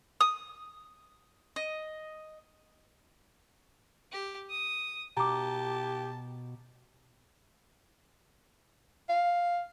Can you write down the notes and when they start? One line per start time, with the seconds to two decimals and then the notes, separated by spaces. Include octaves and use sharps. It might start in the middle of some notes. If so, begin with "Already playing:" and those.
0.21 D#6
1.56 D#5
4.12 G4
4.50 D#6
5.17 B2 G4 A5 A#5 D6
9.09 F5